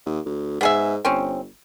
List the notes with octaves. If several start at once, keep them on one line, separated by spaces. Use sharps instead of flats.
D#2
D2
G#2 B3 G#4 E5
G1 C4 C#4